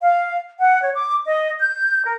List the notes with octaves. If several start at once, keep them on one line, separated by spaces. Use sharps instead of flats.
F5
F#5
C#5
D6
D#5
G6
A#4